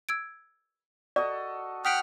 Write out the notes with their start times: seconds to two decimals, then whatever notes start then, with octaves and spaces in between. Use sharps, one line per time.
0.09 E6 G#6 D7
1.16 F#4 A4 D5 D#5
1.85 F#5 G5 D#6 F6 B6 D7